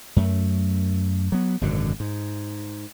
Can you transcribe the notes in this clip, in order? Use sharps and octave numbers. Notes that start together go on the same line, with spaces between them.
F#2 A3
F#3 B3
G#1 F#2 B2 D3
G#2